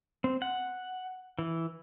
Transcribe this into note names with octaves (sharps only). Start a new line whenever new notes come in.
C4
F#5
E3